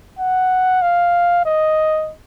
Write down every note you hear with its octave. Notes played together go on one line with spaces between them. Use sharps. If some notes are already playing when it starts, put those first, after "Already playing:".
F#5
F5
D#5